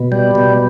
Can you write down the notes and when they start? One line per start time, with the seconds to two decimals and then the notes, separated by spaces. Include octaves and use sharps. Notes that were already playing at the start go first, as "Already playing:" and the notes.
Already playing: B2
0.12 G3
0.35 B2